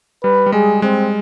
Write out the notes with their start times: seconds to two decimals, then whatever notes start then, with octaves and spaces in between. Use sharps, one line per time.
0.24 G3 B4
0.46 G3
0.52 G#3 G#4
0.82 G#3 C4